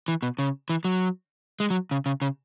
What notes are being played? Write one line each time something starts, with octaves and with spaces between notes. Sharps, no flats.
E3
B2
C#3
E3
F#3
G#3
F#3
C#3
C#3
C#3